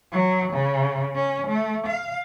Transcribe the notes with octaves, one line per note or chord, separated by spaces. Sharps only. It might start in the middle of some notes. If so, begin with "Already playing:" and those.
F#3
C#3
C#4
A3
F5